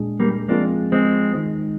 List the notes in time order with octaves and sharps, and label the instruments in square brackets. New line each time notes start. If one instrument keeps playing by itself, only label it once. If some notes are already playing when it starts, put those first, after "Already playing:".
Already playing: [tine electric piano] A#2 G#3 D4 G#4
[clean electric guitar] G3 A#3
[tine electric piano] F3 G#3 C4 F4 G#4 [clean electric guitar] A#3 D4
[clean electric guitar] G#3 C4
[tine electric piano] D#3 G#3 D#4